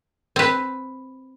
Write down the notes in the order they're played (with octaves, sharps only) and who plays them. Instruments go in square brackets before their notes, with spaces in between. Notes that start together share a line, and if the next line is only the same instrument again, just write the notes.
[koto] C4 B4